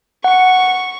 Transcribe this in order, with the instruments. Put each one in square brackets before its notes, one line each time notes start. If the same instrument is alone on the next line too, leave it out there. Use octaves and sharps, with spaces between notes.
[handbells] F#5 [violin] C#6